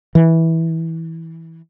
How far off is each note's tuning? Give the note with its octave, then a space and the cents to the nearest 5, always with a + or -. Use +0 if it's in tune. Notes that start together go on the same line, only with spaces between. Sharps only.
E3 -15